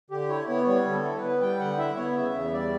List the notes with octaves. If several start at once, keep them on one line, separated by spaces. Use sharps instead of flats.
D3 G4
E4 C#5
B3 C#5
G3 C#5
D3
A4
E4
B4
B3
G3 G5
D3 F#5
E4 E5
B3 C#5
C#3 E5
E2
G3 D5